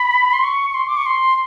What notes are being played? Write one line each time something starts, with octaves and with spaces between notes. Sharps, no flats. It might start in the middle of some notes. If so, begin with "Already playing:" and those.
Already playing: B5
C6
C#6
C#6
C6
D6
C#6
C6